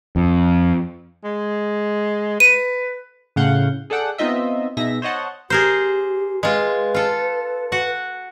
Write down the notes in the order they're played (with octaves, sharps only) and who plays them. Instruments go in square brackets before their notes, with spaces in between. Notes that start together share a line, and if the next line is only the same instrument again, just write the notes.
[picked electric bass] F2
[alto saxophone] G#3
[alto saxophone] B4 [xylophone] D#7
[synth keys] A2 C#3 F5 F#5 G6
G#4 A4 D5 F#5 G5
B3 C4 D#4 F4 D#5 E5
B2 D#4 G#4 E5 A#6
C5 C#5 D#5 F#5 A5
[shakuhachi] G4 [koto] G#4 A#4 C5
[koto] G#3 F4 [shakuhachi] B4
[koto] F4 A4
F#4 F#5